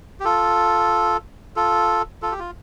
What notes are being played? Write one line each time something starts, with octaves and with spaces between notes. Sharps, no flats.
G4
F4 A4
F4 A4
F4 A4
G4
F4